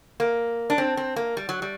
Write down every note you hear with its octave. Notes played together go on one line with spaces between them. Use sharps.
A#3
D4
C4
C4
A#3
G3
F#3
G3